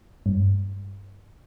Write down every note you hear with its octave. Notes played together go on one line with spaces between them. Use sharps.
G2